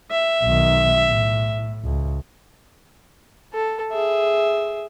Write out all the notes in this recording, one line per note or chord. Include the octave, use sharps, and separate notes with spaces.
E5
B1 D#3
A2
C#2
A4
G#4 E5